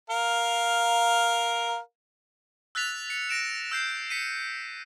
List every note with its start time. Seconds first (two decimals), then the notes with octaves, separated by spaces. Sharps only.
0.10 A#4 F5
2.75 E6 F#6 A6 B6 F7
3.10 C#7
3.29 A#6 D7 E7
3.71 E6 G6 C7
4.10 B6 C#7 D#7